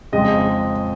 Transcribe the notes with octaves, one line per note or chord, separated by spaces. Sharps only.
F2 C#3 G#3 D#5